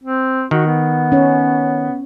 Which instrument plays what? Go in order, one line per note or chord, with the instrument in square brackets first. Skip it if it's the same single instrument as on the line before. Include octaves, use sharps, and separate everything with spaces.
[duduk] C4
[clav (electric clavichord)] D#3 [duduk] F#4
[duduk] B3
[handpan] C#4 C#5